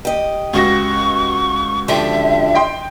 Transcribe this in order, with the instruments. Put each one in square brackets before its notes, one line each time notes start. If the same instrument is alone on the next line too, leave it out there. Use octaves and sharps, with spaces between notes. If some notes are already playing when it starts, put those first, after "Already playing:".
[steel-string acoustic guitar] G4 D#5
[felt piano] C#2 F#4 A#6 [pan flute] C#6
[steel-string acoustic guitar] D3 F3 G4 [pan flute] E5
[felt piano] D#5 G5 C6